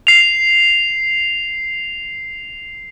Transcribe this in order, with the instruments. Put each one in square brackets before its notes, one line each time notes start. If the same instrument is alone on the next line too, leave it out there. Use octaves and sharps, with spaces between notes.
[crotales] C7 F7